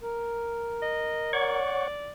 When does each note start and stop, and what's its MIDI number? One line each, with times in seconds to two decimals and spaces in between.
0.01 1.57 70
0.82 1.32 75
1.33 1.88 73
1.33 2.12 74
1.33 1.88 78
1.33 1.88 85